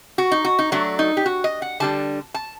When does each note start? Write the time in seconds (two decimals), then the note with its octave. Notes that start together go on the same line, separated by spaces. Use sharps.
0.18 F#4
0.31 D#4
0.45 F#4
0.59 D#4
0.72 F#3 A3 D4 F#4
0.99 D#4
1.17 G4
1.26 F#4
1.44 D#5
1.62 F#5
1.80 D3 G3 D4 A5
2.34 A5